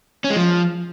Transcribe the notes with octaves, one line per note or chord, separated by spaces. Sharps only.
C#4
G#3
F3